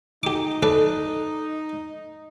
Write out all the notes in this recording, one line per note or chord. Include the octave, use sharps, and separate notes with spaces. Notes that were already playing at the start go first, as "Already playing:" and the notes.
D#4 G4 D6
A4 B4 D5